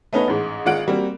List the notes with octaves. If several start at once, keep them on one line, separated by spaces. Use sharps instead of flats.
A3 B3 C#4 D#4 B4
A1 G#2
G#1 G#3 F4 F#5 F#6 D7
G3 A#3 C4 F#4